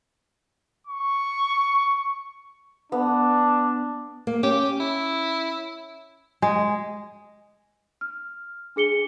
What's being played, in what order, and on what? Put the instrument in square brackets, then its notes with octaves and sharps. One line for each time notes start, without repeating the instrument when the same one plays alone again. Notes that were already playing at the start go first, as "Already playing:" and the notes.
[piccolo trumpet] C#6
[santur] B3 [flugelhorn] D4
[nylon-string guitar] A#3
[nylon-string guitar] C#4 [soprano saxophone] G4
[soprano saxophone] E4
[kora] G#3
[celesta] F6
D4 G#4 C#7 G7